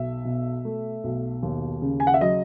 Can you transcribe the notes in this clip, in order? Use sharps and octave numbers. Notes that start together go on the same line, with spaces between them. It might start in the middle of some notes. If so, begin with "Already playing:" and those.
Already playing: B1 E5
B2
A3
B1
D#2
C#3
G#5
F#5
E5
F#3 D#5